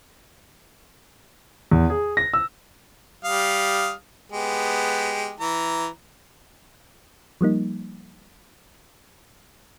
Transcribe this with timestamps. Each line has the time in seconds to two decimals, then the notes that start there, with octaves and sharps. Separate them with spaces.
1.71 E2
1.90 G#4
2.17 A#6
2.34 E6
3.24 G3 F5 D#6
4.32 G#3 B3 G4
5.40 E3 A#5
7.41 F3 G3 A#3 D#4